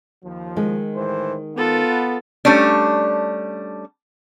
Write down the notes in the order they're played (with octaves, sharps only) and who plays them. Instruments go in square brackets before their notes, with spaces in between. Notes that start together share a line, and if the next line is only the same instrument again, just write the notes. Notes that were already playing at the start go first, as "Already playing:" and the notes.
[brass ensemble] D#2 F3
[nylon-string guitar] D#3 G#3
[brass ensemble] A2 E3 C5
[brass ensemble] B3 [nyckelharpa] F4 A4
[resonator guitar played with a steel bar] G3 A3 C#4 D4